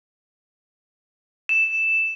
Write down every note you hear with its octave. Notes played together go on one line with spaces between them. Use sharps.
E7